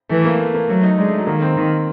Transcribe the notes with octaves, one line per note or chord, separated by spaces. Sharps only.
E3 A3
A#3
A3
A#3
F#3 A3
D#4
G#3 D4
A3
F#3
D#3 A#3
C4
D#3